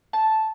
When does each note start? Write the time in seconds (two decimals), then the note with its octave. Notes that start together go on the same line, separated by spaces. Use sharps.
0.13 A5